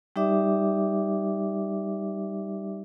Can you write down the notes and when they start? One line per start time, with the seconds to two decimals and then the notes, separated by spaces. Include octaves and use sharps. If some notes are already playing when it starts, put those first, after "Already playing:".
0.16 G3 D#4 G4 D5 E5 D6